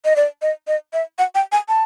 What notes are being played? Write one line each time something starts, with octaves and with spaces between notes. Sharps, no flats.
D#5
D5
D#5
D#5
E5
F#5
G5
G#5
A5